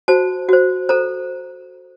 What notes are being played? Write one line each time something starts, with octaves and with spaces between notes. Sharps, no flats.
F#4 C5 A5
F#4 C5
A4 C5 A#5